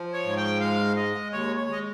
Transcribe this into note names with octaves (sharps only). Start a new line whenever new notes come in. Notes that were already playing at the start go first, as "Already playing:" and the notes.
Already playing: F3
C#5
G#2
G5
G#3 F5
G#3 D#5
D#2 C#5
C#5
G#3 D#5